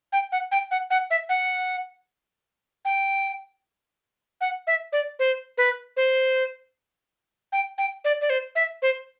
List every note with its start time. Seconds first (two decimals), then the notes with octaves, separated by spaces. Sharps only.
0.13 G5
0.32 F#5
0.51 G5
0.71 F#5
0.90 F#5
1.10 E5
1.29 F#5
2.85 G5
4.41 F#5
4.67 E5
4.93 D5
5.19 C5
5.58 B4
5.97 C5
7.52 G5
7.78 G5
8.05 D5
8.21 D5
8.30 C5
8.55 E5
8.82 C5